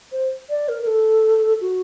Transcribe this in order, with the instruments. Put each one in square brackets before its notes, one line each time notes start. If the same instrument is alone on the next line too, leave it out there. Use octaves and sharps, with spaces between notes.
[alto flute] C5
D5
A#4
A#4
A4
F#4